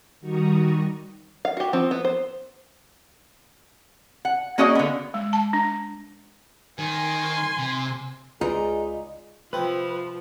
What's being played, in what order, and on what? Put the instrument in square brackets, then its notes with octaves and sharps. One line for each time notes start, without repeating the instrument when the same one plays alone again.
[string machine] D#3 G3 F#4 A#5 C#6 D#6
[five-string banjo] F5
F#4 G4
F3 C4
B3
C5
[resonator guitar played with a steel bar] F#5
A#3 C#4 F#4 G#4 D5 D#5
D3 B3
[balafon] G#3
A5
D4
[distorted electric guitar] D#3 [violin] G#5 C6
[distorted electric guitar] C3
[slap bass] C#2 [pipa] D#4 [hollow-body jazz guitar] F4 B4 D5 [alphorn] G#4
[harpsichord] C3 C4 [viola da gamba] F3 [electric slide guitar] B4